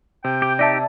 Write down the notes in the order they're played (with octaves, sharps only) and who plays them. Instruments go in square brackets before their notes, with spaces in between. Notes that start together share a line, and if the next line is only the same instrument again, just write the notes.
[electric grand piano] C3 [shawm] G5
[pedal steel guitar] G4
[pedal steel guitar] D#4 G4 [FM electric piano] D5 E5 A5